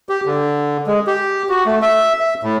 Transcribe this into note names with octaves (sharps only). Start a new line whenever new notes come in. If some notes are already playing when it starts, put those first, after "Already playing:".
G4
D3
G#3
G4
F#4
A3
E5
E5
A2